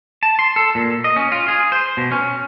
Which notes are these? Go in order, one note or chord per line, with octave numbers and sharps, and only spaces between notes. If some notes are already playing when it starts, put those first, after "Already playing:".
A5
C6
A4
A#2
D#5
C#4
F4
G#4
C5
B2
C#4